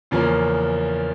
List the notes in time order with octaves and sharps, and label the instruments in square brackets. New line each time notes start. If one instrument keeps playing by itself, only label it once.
[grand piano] E2 C#3 F3 A#3 C#4